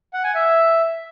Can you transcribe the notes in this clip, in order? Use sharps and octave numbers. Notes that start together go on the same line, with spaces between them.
F#5
G#5
E5